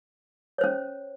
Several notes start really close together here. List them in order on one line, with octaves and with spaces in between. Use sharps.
C#5 C5 C#4